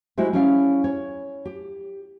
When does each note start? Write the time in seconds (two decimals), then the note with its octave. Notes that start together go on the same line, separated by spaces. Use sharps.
0.18 G#3 E4 F#4 G4 C5 E5
0.33 C#4 E4 G4 C#5 D5 F5
0.84 C#5
1.45 G4